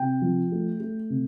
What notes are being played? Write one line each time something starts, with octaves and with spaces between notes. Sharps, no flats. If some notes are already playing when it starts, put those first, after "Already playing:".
Already playing: C3 G5
F3
A3
A3
C3